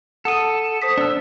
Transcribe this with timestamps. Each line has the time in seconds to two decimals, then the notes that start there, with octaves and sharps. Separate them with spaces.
0.25 A4 F#5 D#6 D#7
0.82 C5 D#6 B6
0.98 D4 E6